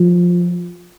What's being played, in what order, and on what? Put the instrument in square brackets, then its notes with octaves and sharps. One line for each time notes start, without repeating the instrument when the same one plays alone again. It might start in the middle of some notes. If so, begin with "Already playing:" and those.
Already playing: [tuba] F3